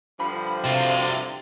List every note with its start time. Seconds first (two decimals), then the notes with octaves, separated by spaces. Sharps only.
0.20 G2 D3 F3 B5
0.64 C3 F#4 F5